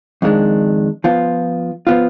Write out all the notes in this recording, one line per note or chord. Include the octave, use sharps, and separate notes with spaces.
F2 D#3 G#3 D4
F3 B3 F4
F3 B3 F4